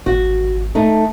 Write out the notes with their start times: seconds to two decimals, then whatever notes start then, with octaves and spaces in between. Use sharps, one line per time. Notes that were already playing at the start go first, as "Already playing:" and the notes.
0.06 G#1 F#4
0.75 A3 D#4